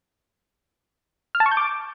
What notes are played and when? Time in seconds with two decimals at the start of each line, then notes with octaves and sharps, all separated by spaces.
1.35 F6
1.40 A5
1.46 C#6
1.51 G6
1.57 D6